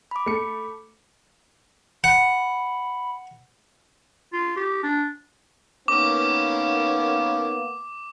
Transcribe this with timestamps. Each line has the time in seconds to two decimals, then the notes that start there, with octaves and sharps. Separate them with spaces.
0.11 B5 D6
0.26 A3 C#7
2.04 F#5 B5
4.33 F4
4.56 G4
4.83 D4
5.88 D#3 A#3 B3 C#4 D6